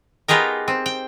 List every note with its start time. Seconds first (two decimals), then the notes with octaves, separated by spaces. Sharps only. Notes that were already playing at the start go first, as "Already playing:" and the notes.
0.28 B3 D#4 F4 G4 G#4 A#4
0.68 C4
0.86 G5